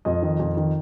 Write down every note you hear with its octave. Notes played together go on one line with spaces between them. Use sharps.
F2 D#5
D#3
F2
D#3